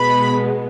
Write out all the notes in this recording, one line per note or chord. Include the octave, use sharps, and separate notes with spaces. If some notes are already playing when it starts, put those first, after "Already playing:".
Already playing: B2 G#3 B3 B5